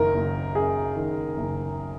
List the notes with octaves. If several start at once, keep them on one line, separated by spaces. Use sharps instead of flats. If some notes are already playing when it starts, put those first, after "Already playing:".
Already playing: F#1 F#2 D#3 A#4
F#1
F#2 G#4
D#3
F#1